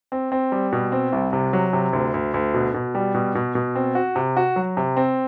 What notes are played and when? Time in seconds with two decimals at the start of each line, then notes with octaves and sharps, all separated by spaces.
0.12 C4
0.32 C4
0.52 G3
0.72 B2
0.92 C4
1.12 C2
1.33 C3
1.53 F#3
1.73 C3
1.93 D2
2.14 D2
2.34 D2
2.54 B2
2.74 B2
2.95 G3
3.14 B2
3.35 B2
3.55 B2
3.75 C4
3.95 F#4
4.16 C3
4.37 F#4
4.56 F#3
4.77 C3
4.97 C4